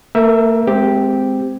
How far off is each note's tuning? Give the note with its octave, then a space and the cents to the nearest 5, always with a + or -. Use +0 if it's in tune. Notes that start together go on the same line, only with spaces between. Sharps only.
A#3 -45 A#4 +30 E5 +0
G#3 +0 C4 -15 G4 +0